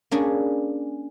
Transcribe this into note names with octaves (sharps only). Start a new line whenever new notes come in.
A#3 C#4 D4 G#4